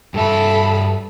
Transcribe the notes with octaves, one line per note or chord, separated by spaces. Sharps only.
G2 A4 E5 B5